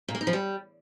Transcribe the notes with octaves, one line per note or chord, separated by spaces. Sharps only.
A#2
A#3
D#4
F3
G3